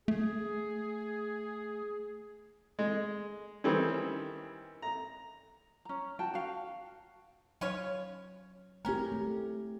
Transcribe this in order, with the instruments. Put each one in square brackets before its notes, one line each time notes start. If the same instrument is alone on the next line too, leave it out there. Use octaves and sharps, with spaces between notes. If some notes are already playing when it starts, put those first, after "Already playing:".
[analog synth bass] A3 [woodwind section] G#4
[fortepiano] G#3
D#3 E3 G3 C4 C#4
A#5
[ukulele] C#4 A#5
F#4 G5 A5
F#4 F5
[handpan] F#3 [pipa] C#4 F4 C#5
[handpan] A3 C4 G4 [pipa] C#4 A#4
[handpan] A3